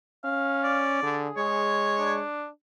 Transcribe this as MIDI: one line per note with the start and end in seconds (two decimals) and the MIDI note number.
0.24 0.99 61
0.24 0.81 77
0.64 1.17 74
1.02 1.29 50
1.02 1.65 68
1.37 2.22 56
1.37 2.17 73
1.99 2.47 62